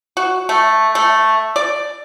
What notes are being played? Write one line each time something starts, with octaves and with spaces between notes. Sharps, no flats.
F#4
A3
A3
D5